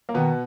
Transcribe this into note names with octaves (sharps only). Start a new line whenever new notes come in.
A#3
B2 D#3 B3